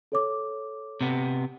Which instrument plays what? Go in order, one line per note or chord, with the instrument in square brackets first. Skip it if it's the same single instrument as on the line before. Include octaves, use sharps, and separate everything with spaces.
[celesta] A4 C#5 D6
[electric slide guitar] C3 B3